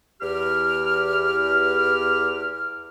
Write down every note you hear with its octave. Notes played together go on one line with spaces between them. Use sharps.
E2 G4 F6